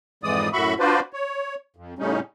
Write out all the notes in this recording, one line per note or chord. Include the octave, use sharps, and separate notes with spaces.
F2 G#2 E3 G#3 D5 D#6
F#2 A2 F#4 E5 B5 C#6
D4 F4 F#4 B4 C5 D5
C#5
F2
A2 C#3 G3 C#4 D#4